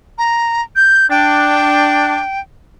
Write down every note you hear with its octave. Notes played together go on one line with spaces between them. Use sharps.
A#5
G6
D4 G5